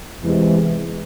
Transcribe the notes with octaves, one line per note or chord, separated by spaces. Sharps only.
E2 C3 E3 G#3